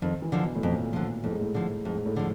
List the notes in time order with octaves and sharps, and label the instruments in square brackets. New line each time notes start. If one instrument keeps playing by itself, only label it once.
[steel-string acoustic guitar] F2 [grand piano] D#3
[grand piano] E3
[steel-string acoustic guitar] D3 F3
[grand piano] B2
A2
[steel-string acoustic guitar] F2 [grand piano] A#2
[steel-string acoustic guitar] D3 F3
[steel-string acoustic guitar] F2 [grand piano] A2
[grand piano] G#2
A2
[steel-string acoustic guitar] D3 F3
[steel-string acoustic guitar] F2 [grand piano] G#2
[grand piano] A2
[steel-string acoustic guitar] D3 F3